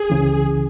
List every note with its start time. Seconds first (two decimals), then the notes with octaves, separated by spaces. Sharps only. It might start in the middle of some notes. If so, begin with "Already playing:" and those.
Already playing: G#4
0.10 C#2 C#3 E3